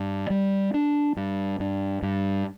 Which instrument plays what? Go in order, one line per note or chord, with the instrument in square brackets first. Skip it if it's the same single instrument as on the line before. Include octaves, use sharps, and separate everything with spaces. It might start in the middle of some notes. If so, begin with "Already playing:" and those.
Already playing: [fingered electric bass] G2
G3
D4
G2
G2
G2